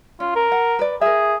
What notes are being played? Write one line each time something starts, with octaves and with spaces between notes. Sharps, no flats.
C#4 F4
A#4
F#5
B4 D5
G#4 A#4 E5